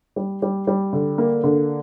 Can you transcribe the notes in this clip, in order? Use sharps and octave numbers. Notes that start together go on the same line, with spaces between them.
G3
G3
G3
D3
A#3
D3